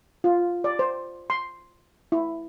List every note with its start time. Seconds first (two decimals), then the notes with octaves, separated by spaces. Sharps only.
0.24 F4
0.64 D5
0.79 C5
1.30 C6
2.12 E4